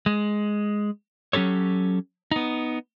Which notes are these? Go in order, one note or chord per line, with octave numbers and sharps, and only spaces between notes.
G#3
F#3 C#4 G4 A4 C#5
B3 D#4